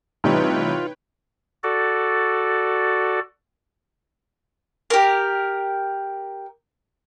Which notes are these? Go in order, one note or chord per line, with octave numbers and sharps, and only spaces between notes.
A1 C3 G3 D#4 F4 B4 C#5 G5
F#4 A4 D5
G4 A#4